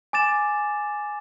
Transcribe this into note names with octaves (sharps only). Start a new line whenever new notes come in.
G#5 D6 A6 E7